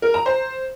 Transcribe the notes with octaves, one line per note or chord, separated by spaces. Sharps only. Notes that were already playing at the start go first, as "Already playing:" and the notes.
A#4
A#5
C5